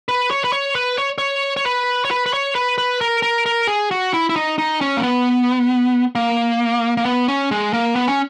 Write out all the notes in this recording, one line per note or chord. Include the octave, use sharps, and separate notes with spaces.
B4
C#5
B4
C#5
B4
C#5
C#5
C#5
B4
C#5
B4
B4
C#5
B4
B4
A#4
A#4
A#4
G#4
F#4
E4
E4
D#4
D#4
C#4
A#3
B3
A#3
A#3
B3
C#4
G#3
A#3
B3
C#4